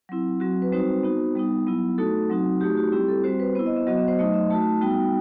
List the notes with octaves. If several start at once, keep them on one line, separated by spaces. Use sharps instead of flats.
F#3 C4 E4
F#3 C4 F#4
B4
G3 C4 D#4 F#4 C5
B3 D#4 F#4
G3 B3 D#4
F#3 B3 E4
A3 D#4 F#4 A4
F#3 C4 D#4 F#4
A3 D#4 F#4 G4
F#4
G3 C4 E4 G4
A4
G3 C4 F#4 C5
B4
B3 E4 C5
D#5
E5
F#3 B3 F#4 D#5
E5
C5
F#3 A3 D#4 D#5
E5
A3 D#4 F#4 A5
G3 B3 D#4 F#4 G5